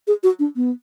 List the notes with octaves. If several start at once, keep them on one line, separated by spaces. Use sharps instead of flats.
G#4
F#4
D4
B3